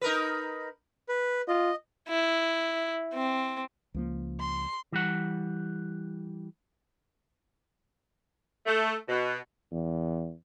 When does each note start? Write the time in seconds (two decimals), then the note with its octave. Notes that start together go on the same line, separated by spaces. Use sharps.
0.01 D#4 A#4 B4
1.09 B4
1.48 F4 D#5
2.09 E4
3.14 C4
3.94 C#2 F3 A#3
4.40 C6
4.92 E3 G3 F#5
8.66 A3
9.08 B2
9.71 E2